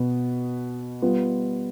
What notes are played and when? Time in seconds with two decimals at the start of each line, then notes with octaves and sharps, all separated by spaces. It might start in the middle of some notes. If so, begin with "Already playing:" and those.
Already playing: B2 B3 B4
1.02 G3 B3 F4 B4